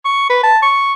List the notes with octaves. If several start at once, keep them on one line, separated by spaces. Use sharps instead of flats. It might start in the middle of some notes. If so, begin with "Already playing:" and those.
C#6
B4
A5
C#6